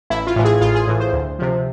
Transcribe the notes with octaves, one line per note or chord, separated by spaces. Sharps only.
A1 E4
F4
A2 E3
G#4
A1 F4
G#4
A2 E3
C5
D2
C3 F3